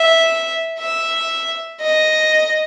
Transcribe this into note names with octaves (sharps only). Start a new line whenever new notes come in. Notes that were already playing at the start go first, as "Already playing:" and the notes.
Already playing: E5
E5
D#5